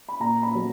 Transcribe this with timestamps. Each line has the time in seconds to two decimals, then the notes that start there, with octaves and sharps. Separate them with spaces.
0.09 B5
0.20 A#2 A#5
0.43 B5
0.55 F#3 B3